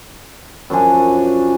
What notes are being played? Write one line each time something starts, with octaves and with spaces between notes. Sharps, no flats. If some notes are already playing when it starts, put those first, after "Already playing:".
F#2 F3 D4 G#5